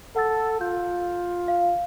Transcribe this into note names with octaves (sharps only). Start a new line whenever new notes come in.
A4 F#5 E6 A6
F4 G6
F5